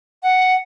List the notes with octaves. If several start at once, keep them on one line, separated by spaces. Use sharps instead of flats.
F#5